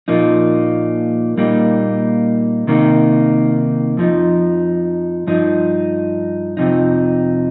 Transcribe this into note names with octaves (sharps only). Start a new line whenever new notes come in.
A#2 F3 A#3 D#4
A#2 G3 A#3 D#4
C3 D#3 A#3 D#4
F2 F3 D#4
G2 F3 D#4
F2 C3 F3 D#4